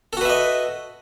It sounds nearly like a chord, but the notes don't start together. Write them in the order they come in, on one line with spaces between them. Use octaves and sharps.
A4 F#4 B4 E5 D#5